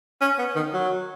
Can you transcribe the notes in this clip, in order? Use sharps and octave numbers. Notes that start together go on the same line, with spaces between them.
C#4
B3
D#3
F#3